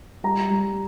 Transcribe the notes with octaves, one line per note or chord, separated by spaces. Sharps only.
G3 A#5
G3